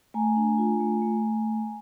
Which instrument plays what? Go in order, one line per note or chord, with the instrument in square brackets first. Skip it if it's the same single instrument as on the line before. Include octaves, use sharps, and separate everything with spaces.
[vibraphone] A3 G#5 A#5
D4
F4
A3
A3